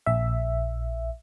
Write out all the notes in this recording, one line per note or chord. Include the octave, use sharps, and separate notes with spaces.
A#1 E5